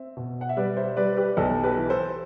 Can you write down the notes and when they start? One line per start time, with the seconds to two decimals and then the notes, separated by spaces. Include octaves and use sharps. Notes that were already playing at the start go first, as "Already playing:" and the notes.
Already playing: C4 E5
0.17 B2
0.41 F#5
0.49 E5
0.57 G3 B4 D5
0.77 C5 E5
0.97 G3 B4 D5
1.17 G4 B4
1.37 B1 A4
1.63 G4 B4
1.77 E3
1.90 A4 C5